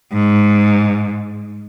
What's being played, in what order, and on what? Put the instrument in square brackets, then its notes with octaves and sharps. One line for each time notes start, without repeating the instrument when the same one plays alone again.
[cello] G#2